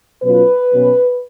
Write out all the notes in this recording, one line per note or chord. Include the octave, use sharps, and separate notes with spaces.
B2 F#3 C#4 F4 B4
B2 F#3 C#4